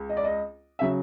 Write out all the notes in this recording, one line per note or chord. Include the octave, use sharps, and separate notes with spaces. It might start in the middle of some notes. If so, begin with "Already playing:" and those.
Already playing: C#2
D#5
D5
D#5
C#3 F#3 E5